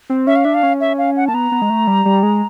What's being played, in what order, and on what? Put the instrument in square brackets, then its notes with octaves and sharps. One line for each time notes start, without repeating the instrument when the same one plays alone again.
[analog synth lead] C4
[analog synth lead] C#4 [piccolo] E5
[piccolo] F5
[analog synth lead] D4 [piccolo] E5
[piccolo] F5
[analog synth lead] C#4
[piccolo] E5
F5
F#5
[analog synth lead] A#3 [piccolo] A5
[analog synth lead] B3 [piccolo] A#5
[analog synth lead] B3
G#3
A3
G3
G3
G#3